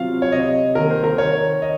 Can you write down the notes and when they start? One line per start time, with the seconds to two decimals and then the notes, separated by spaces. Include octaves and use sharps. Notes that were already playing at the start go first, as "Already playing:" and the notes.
Already playing: C3 F#3 C4 F4 F5
0.22 C#5
0.32 C3 D#5
0.75 D#3 A#3 A#4
0.90 C5
1.04 A#4
1.18 D#3 C#5
1.62 D#5